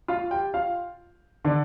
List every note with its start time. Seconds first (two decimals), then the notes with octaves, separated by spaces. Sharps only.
0.08 F4 F5
0.31 G4 G5
0.54 F4 F5
1.45 D3 D4